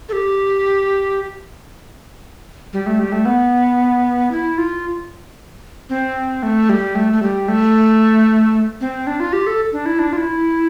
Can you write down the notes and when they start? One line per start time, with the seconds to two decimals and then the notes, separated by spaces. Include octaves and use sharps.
0.09 A4
0.13 G4
2.73 G3
2.86 A3
2.99 G3
3.12 A3
3.25 B3
4.31 E4
4.58 F4
5.89 C4
6.43 A3
6.69 G3
6.95 A3
7.13 A3
7.22 G3
7.48 A3
8.81 C4
9.07 D4
9.20 F4
9.33 G4
9.47 A4
9.73 D4
9.86 E4
9.99 D4
10.13 F4
10.17 E4